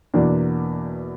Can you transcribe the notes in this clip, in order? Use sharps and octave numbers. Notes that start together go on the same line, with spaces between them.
E2 B2 A#3 D4